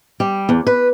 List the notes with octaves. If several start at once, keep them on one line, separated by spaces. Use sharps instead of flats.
G3
E2
B4